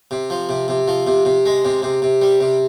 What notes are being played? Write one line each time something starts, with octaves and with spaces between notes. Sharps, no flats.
C3
F3
C3
C3
F3
C3
C3
G#3
C3
C3
C3
G3
C3